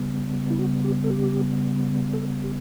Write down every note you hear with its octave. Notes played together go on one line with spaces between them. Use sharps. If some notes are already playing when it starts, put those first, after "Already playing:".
Already playing: C#3 G3 B3
E4
F#4
G4
A4
G4
A4
G4